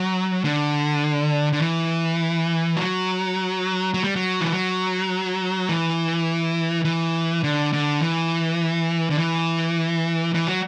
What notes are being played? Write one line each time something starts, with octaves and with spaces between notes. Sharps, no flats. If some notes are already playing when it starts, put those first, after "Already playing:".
Already playing: F#3
D3
D3
E3
F#3
F#3
G3
F#3
E3
F#3
E3
E3
D3
D3
E3
D3
E3
E3
F#3